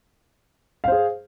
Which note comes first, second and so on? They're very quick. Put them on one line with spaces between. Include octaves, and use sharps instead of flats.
F5 C5 G#4